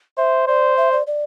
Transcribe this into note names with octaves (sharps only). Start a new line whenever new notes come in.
C5 E5
C5 D5
E5
D5
D5